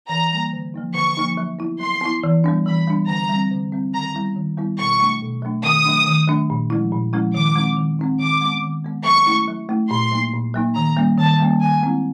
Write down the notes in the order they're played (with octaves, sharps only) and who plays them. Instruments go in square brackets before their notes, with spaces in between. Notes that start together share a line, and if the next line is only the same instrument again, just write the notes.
[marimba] E3 [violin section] A#5
[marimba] G3 A#3
D3
F3 A#3 D#4
[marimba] D3 [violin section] C#6
[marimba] F3 A#3 D#4
F#3
B3 E4
[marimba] F#3 [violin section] C6
[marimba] B3 E4
E3
G3 B3 D4
[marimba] E3 [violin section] B5
[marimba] G3 B3 D4
[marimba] D3 [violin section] A#5
[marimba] G3 C4
D3
G3 C4
[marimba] D#3 [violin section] A#5
[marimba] G3 B3 E4
D#3
G3 B3 E4
[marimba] B2 [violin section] C#6
[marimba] F#3 A3 D4
B2
F#3 A3 D4
[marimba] D#3 [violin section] D#6
[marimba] F#3 A3 D4
D#3
F#3 A3 D4
A#2
F3 G#3 C#4 E4
A#2
F3 G#3 C#4 E4
[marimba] D#3 [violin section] D6
[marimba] G#3 C4 D#4
D#3
G#3 C4 D#4
[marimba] D#3 [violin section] D6
[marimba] G#3 B3
D#3
G#3 B3
[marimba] F#3 [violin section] C#6
[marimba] A3 C#4 E4
F#3
A3 C#4 E4
[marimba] A#2 [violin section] C6
[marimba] F#3 A#3 D#4
A#2
F#3 A#3 D#4
[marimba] D#3 [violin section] A#5
[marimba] G3 A#3 C#4
[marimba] D#3 [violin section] A5
[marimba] G3 A#3 C#4
[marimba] D#3 [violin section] G#5
[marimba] G#3 C4 E4